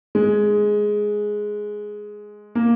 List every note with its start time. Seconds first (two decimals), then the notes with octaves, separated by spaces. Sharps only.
0.15 G#3
2.55 A#3